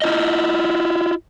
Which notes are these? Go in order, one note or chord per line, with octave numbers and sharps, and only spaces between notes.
E4 F4 D#5